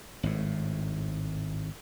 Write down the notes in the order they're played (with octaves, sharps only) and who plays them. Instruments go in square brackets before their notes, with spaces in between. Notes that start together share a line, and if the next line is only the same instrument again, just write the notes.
[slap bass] G#1 A2